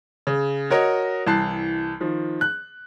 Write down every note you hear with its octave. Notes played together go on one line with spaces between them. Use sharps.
C#3
F#4 A#4 C#5 D#5
C2 E3 A5 F#6 C7
D#3 F3
F#6